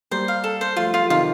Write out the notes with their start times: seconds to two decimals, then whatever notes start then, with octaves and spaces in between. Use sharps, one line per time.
0.11 G3 A#3 C5
0.28 F5
0.44 A4
0.61 C5
0.76 F3 A3 F4
0.94 F4
1.02 F3
1.10 C3 D#3 F4